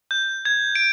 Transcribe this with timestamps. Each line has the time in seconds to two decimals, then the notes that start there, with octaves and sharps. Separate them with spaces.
0.11 G6
0.45 G#6
0.75 D7